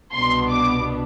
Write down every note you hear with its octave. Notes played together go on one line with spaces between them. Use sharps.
C2 B2 B3 D4 C6
D6